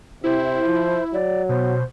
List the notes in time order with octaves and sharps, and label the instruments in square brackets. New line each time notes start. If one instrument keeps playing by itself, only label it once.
[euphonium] C3 [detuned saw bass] E4 [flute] C5
[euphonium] F3
[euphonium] F#3 [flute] D5
[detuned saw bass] B2 [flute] C5